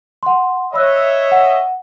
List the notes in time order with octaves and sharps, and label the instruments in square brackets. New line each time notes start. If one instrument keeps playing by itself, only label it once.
[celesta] F#5 C6
[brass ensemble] C#5 D#5 E5 [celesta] B5 E6 F#6
[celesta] F#5